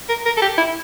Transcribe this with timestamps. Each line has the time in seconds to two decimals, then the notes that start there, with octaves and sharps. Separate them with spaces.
0.09 A#4
0.26 A#4
0.37 A4
0.42 G4
0.58 E4